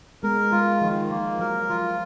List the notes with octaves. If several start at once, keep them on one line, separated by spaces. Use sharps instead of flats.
G#3 B3 A#4
G#3 F4
D#3 F3
F3 A#3
F#3 A#4
F3 F4